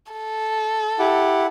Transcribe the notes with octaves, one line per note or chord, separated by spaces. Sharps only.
A4
E4 G4 F#5